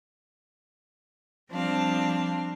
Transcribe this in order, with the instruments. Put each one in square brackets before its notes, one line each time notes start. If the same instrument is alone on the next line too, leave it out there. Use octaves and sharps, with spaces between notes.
[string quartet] F3 G3 C4 D4 F5